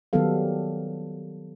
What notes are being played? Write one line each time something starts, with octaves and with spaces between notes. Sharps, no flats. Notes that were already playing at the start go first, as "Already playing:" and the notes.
D#3 F#3 G3 B3 A4 F5